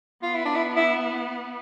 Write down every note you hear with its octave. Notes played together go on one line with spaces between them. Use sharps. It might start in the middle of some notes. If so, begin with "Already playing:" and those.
B3 F4
E4
D4
E4
E4